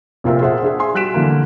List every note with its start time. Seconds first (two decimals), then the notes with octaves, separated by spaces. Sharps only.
0.24 F1 A#2 C4 F4 A#4 E5
0.40 F4 G#4 C5 E5 F#5
0.63 D4 G#4 E5
0.79 G#5 C6
0.94 G3 F#4 F#6 B6 D7 E7
1.14 D3 E3 A#3